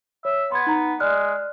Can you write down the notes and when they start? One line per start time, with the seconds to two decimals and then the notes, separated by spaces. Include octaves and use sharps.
0.25 C#5 E5
0.52 B3 C6 G#6
0.67 D#4 A#5
1.00 G#3 D5 F6 F#6